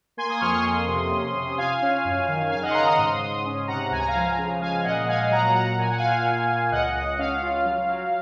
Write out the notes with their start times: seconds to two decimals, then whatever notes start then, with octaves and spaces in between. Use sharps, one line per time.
0.17 A#3 G#5 C6
0.29 C6 D#6
0.41 F2 C#6 F6
0.53 C6 D#6
0.64 A#3
0.88 C3
1.11 C#4
1.35 C3
1.58 F4 F5 G#5
1.82 C#4
2.05 F#2
2.28 D#3
2.51 C#3 F5 G#5
2.63 D#5 F#5
2.70 C6
2.74 C#3 F#5 A#5
2.86 C6 D#6
2.98 G#2
3.21 G#2
3.45 C#4
3.67 C3 F#5 A#5
3.91 C#2 G#5
3.99 A#5
4.07 F5 G#5
4.15 F3
4.38 C#3
4.61 G#3 F5 G#5
4.84 A#2 D#5 F#5
5.08 A#2 F5 G#5
5.31 F#3 F#5 A#5
5.54 F#3 F#5 A#5
5.78 A#2 G#5
5.89 F#5
5.98 F4 F5 G#5
6.25 A#2
6.48 A#2
6.71 C#2 D#5 F#5
6.95 C#2
7.19 C#4 F5
7.42 F4
7.65 F#3
7.89 F#3